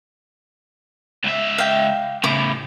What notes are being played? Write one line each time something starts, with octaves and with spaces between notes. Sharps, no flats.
C#2 E5
F5 G5
A2 C#3 E4 D6